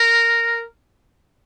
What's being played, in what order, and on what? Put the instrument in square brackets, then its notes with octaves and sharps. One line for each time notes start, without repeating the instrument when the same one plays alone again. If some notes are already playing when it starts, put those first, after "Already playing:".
Already playing: [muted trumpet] A#4